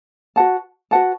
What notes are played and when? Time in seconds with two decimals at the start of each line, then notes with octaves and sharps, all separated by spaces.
0.36 F#4 B4 F#5 A5
0.91 F#4 B4 F#5 A5